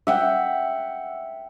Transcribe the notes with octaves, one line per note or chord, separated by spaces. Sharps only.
E5 F#5 G5